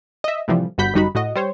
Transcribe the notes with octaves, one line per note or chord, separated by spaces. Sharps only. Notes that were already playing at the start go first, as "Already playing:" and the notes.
D#5 E5
A2 C3 E3 F3 G3
G1 G2 F#4 B5 G6 B6
G1 F#2 G3 D#4 F#4 B5
A2 F#4 D#5
G3 C5 C#5